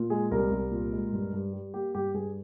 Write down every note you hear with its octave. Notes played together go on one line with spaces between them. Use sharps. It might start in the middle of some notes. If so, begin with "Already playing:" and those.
Already playing: A#2
G#3 G#4
C2 A#4
C2
A#2
G#3
G2
G2
G3
A#3 G4
G2 G4
G2 G#4